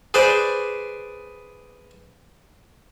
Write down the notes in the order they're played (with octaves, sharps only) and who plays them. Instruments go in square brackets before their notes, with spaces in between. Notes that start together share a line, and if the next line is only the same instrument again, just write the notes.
[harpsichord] G#4 B4 C5 D5